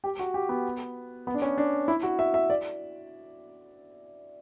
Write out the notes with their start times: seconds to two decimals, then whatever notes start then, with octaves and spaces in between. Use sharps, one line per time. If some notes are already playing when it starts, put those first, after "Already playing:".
0.04 G4
0.19 F#4
0.34 G4
0.49 B3
1.27 B3
1.34 D4
1.42 C#4
1.58 D4
1.88 E4
2.03 F#4
2.19 E5
2.34 E5
2.50 D5